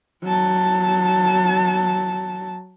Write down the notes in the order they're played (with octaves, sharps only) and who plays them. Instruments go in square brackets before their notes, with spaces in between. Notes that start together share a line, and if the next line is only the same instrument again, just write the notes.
[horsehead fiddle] F#3 A5